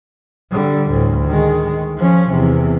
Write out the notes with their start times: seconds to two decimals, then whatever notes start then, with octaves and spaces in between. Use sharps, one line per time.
0.51 D3 G3
0.90 D2 A2
1.28 D#3 G#3
1.97 F3 C#4
2.31 E2 C3